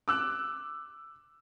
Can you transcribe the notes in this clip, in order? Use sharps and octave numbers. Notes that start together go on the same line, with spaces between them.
D6 E6 F#6